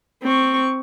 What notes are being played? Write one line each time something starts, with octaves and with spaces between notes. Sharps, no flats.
C4 C#6